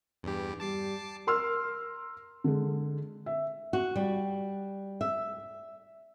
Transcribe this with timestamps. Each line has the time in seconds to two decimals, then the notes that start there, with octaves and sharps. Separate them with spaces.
0.23 E2 G2 G4
0.60 G3 A5 D6 C7
1.27 A#4 C6 E6 F6
2.44 D3 G#3
3.26 E5
3.73 F#4
3.96 G3
5.01 E5